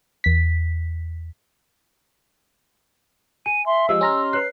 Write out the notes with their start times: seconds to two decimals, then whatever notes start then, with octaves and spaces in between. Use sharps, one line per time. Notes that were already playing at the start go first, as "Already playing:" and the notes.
0.24 E2 B6
3.46 G#5 D#7
3.66 E5 C6
3.89 F3 G#3 G4 D#5 E6
4.01 C#4 A#5 C6 F6
4.33 B4 C#5 F#6 C7